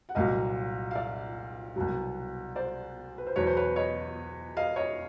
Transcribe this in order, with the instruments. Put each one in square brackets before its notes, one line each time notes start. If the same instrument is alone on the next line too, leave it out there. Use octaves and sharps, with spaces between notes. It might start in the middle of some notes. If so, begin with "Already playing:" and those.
[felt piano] F#5
C2 A#2 F#3 D#5 F5
F5
D5 E5
C2 B2 F#3
C5 D5
B4
C5
E2 B2 F#3 B4 C#5
C5
B4 C#5
C#5 D#5
D#5 F5
C#5 D#5